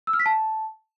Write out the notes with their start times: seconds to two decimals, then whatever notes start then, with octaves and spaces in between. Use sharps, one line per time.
0.07 E6
0.13 F6
0.20 B6
0.26 A5